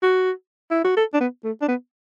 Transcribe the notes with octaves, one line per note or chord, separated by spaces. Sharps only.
F#4
E4
F#4
A4
D4
B3
A3
D4
B3